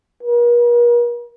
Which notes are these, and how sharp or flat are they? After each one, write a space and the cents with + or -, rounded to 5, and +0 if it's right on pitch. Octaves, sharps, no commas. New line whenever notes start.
A#4 +45